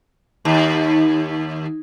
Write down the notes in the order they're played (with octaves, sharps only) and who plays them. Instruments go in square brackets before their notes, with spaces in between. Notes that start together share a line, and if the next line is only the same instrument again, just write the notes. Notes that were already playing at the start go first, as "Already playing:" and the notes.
[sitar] D#2